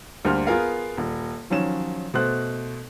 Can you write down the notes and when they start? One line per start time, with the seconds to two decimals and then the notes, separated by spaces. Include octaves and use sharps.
0.25 D2 G3 A#3 C5 F6
0.47 B3 F4 G#4 A#4 F5
0.97 D#1
1.50 D#3 F3 F#3 C#4 E7
2.14 B2 A3 C5 F#6